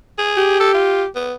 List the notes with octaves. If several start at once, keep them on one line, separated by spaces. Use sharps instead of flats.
G#4
G4
A4
F4
B3